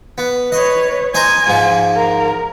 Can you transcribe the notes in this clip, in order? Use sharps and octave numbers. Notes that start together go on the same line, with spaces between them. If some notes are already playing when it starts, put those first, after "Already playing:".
B3
B4 C#5 D#5
C5 D#5 G#5 A#5
G#2 F3
A#4